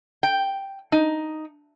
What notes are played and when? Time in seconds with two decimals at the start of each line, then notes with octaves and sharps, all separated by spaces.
0.23 G5
0.92 D#4